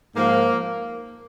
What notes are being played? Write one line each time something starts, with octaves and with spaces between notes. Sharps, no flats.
G#2 F3 A#3